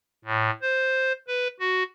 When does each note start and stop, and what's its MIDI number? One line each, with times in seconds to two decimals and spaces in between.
0.25 0.50 45
0.62 1.13 72
1.27 1.47 71
1.60 1.83 66